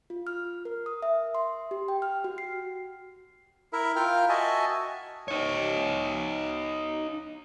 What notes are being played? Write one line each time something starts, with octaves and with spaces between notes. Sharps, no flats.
F4
F6
A#4
D#6
E5
C6
G4
G5
F6
F#4
C7
E4 A#4 E5
F4 A#4 F5 G5 F6
F#4 D#5 E5 G#5 A5
D#4 C#5